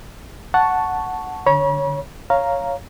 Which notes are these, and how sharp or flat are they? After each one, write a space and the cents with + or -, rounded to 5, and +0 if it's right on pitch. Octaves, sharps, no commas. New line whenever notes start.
F#5 +0 A5 +0 C#6 +0
D3 +0 C#5 +0 B5 -45
C#5 +0 F5 +0 A#5 +0